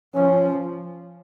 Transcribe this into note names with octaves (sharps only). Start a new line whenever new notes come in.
F3 C#4